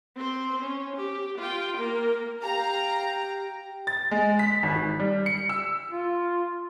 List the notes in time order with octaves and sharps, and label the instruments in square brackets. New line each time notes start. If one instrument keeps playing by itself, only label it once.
[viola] C4 C5
C#4
G4
F4 G5
A#3 A#4
[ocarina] G4 [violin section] F5 A#5 [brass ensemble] G5
[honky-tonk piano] A6
G#3
B6
G#1
D#3
G3
C#7
E6
[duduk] F4